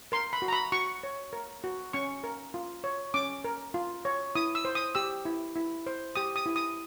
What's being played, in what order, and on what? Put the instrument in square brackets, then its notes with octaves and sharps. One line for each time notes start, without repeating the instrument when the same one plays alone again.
[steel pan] A#4 C6
B5
F#4
A#5
B5
F#4 C#6
C#5
A#4
F#4
C#4 C#6
A#4
F4
C#5
C#4 D6
A#4
F4
C#5
E4 D#6
E6
C5
D#6
G4 E6
E4
E4
C5
G4 D#6
D#6
E4
D#6